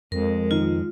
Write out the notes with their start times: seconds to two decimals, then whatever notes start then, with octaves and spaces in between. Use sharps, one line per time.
0.12 F2 G#3 A#4
0.51 D#3 D#4 F4